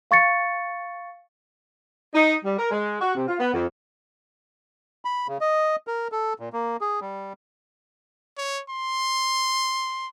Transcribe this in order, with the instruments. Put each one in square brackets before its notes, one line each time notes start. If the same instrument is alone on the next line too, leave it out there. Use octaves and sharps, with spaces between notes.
[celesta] F5 C#6 A6 C#7
[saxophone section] D#4
G3
A#4
G#3
F#4
C3
F4
B3
F2
[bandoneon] B5
C#3
D#5
A#4
A4
A#2
A#3
G#4
G3
[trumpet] C#5
C6